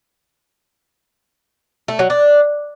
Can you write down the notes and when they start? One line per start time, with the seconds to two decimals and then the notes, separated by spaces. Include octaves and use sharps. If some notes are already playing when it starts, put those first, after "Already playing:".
1.88 A3
1.99 F#3
2.10 D4